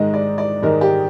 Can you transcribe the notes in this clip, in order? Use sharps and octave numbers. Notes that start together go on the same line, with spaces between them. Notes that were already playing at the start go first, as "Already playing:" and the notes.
Already playing: G#2 D#3 G#3 D#5
D5
D5
G#2 D#3 G#3 A#4
G4